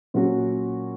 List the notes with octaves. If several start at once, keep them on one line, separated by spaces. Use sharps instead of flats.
A#2 F#3 C#4 F#4